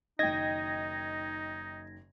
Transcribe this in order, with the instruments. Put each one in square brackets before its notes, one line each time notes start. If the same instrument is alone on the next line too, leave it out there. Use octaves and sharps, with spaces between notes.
[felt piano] F#1 D#3 [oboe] D#4 [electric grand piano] D#5 G5 [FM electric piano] G#6 A#6